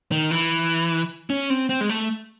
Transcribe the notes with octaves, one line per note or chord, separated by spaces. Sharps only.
D#3
E3
C#4
C4
C4
G#3
A3